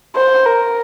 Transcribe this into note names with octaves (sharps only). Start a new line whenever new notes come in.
C5
A#4